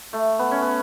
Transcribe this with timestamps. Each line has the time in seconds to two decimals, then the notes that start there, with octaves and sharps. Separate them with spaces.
0.13 A3
0.39 B3
0.51 C#4
0.62 B3